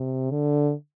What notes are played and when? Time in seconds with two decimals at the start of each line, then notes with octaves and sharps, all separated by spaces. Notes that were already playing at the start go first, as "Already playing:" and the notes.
Already playing: C3
0.31 D3